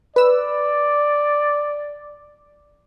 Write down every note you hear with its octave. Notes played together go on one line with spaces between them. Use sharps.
B4 D5 E6